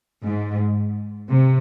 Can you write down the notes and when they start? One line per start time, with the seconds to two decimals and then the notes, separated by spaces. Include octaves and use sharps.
0.25 G#2
1.28 C3